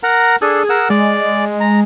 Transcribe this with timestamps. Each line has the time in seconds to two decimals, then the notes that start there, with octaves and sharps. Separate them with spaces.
0.03 A#4 F#5 A#5
0.42 D4 G#4 A4
0.70 A#4 F#5 E6
0.90 G#3 D5
1.60 A#5